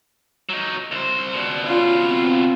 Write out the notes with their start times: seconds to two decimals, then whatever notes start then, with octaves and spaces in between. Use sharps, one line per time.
0.49 F#3 D#4
0.91 C2 C5
1.33 C#2 B2 D5
1.67 C#4 F4
2.06 C4